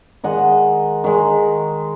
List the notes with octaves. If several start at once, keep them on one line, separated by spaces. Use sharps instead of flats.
D#3 G#3 D#5 F#5
D#3 G#3